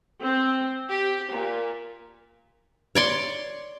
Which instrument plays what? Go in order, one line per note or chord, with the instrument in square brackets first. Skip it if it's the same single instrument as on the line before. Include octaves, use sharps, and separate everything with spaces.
[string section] C4
G4
A#2
[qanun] C#5 D5 C6